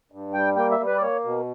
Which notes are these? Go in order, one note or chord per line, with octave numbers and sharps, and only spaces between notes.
G2
G3 G5
A#3 G5
E5
G3
B4
D5
A#3 C#5
B2